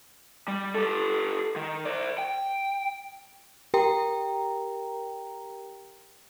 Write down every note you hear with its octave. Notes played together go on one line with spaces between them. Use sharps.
G3
G4 A4
D#3
C5 D5
G5
G4 A#4 G5 A#5